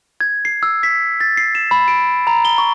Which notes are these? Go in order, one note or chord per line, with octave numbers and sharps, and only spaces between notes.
G#6
C7
E6
B6
A6
C7
E7
B5
D7
A#5
G7
C#6